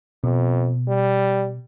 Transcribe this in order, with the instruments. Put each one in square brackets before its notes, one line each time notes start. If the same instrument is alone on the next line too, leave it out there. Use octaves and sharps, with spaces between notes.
[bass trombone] F2 [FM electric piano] B2
[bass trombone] G3